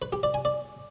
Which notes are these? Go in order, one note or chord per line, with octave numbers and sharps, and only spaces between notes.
B4
G4
D5
G#5
D5